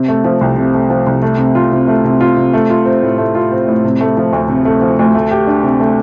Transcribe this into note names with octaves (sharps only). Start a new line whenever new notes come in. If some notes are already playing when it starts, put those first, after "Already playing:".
Already playing: C3
A3
F3
C2
C3
A3
F3
C2
A3
C3
F4
C3
A3
C3
F4
C3
A3
F4
C4
A2
A3
F4
C4
A2
C3
A3
F3
D2
C3
A3
F3
D2
A3
G4
D4
C3
A3